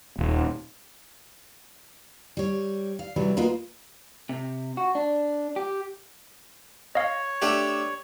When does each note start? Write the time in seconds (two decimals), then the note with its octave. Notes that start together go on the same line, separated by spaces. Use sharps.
0.19 D#1
2.37 G3 C#5
2.99 F5
3.16 C3 E3 F#3 G3
3.37 A#3 F4 F#4 A#4 B4 D#5
4.29 C3
4.77 F#4
4.95 D4
5.56 G4
6.95 C#5 D#5 F5
7.42 A3 D4 G4